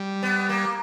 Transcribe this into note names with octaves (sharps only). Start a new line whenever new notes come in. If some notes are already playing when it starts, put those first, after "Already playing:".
Already playing: G3
B3
A#3